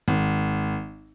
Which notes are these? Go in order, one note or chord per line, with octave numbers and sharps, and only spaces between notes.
G#1